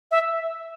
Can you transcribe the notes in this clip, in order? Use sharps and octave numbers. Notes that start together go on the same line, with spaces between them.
E5